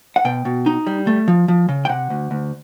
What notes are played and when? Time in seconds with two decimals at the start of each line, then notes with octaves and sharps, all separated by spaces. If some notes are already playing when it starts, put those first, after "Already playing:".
0.16 F#5
0.25 B2 G5
0.45 B2
0.66 D#4
0.87 G3
1.07 A3
1.28 F3
1.48 F3
1.69 C#3
1.85 G5
1.89 C3 F#5
2.10 D2
2.31 D2